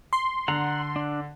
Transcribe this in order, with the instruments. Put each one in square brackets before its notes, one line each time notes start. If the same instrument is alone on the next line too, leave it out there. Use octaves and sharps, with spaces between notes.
[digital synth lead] C6
[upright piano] D3 [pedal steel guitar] F#5 A#5
[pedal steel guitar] D4